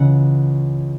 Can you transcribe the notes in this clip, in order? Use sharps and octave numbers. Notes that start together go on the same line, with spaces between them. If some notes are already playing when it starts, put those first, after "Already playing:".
Already playing: C#2 C#3 E3 F#5